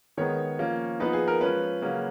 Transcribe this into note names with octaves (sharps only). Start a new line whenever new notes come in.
D#3 G#3 B3 D#4 C#5
F3 A#3 C#4
F3 B3 D#4 B4
G#4
A#4
F3 G#3 C#4 B4
C#3 F#3 A#3 C#4